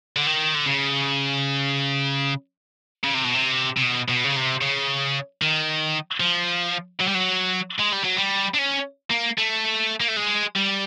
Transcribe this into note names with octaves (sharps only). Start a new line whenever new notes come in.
D3
D#3
D3
C#3
C#3
C3
B2
C3
C3
B2
B2
C#3
C3
C#3
D#3
F3
F#3
G3
F#3
G#3
G3
F#3
G3
D4
C#4
A#3
A3
A#3
A3
G#3
G3